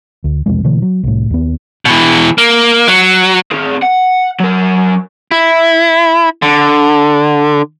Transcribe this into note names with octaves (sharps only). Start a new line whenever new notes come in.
D2
E1 C2 F2 G#3
B2 D3 E3 A3
F#3
C2 A2
D#2 B3
B2 E3
A#3
F#3
C4 G#4
F#5
F#3 A#4
E4
D3